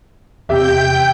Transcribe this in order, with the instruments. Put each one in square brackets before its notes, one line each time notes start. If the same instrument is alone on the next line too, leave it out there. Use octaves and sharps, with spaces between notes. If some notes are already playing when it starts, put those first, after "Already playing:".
[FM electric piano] E2 C3 [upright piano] G4 E5 [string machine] G5 G6